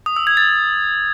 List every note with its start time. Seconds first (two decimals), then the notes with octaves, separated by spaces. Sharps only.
0.06 D#6
0.16 E6
0.27 G#6
0.37 A6